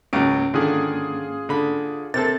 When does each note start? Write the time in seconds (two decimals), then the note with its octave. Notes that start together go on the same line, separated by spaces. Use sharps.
0.13 C#2 G#2 C#3 F#3 A#3 C#4 D7
0.54 D3 D#3 F4 G#4
1.49 D3 B5
2.14 C3 C4 A4 A#4 A6